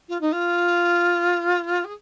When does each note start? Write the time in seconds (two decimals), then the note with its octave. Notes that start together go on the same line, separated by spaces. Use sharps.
0.09 F4
0.21 D#4
0.32 F4
1.85 G#4